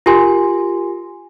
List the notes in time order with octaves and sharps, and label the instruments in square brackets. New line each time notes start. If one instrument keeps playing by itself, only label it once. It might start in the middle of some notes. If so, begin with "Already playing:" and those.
[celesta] F4 G4 A#4 G#5 C6